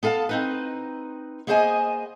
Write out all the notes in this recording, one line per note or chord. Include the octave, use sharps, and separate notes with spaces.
B3 A4 F5 G#5 A5
C4 D#4 B4
A#3 B3 G#4 C5 D#5 G#5